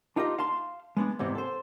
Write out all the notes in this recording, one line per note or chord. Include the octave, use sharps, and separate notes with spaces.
D4 D#4 F4 G4 D5 D#5
F5 A5 C6
G#3 B3 D4
E2 G#2 C3 E3
A4 C5